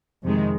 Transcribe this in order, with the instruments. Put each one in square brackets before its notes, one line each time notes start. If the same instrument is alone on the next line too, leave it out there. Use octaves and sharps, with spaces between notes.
[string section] F2 C3 D#3 G#3